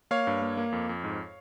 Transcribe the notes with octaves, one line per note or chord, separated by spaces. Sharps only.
A#3 C#5 F5
G2
A#3
A#3
F2
F2
G#2